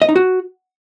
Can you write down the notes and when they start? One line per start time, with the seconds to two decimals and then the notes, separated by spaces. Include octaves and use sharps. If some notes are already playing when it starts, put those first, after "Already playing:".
0.02 D#5
0.09 D#4
0.16 F#4